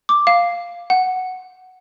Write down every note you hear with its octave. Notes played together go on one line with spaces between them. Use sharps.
D6
F5
F#5